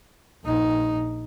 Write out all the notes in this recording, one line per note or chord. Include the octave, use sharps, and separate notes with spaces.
A#1 D#4